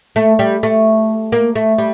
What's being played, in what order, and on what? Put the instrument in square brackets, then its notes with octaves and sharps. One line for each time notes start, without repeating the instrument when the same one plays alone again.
[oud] A3
G3
A3
A#3
A3
G3